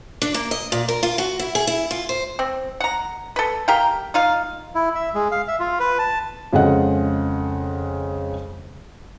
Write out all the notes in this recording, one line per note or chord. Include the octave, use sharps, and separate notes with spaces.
D4
A#3
D#5
A#2
A#4
F4
F#4
E4
G#4
E4
F4
C5
C4
F#5 A#5
A4 B4
G4 A#4 F5 G5
D#4 F4 F5
E4
E5
G#3
F5
E5
F4
B4
A5
F2 C#3 G#3 A4 D#5 F#5